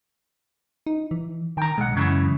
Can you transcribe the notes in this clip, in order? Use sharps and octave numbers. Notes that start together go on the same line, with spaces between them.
D#4
E3
D#3 G5 A#5
B1 G#3 F#5
F#2 C#3 E3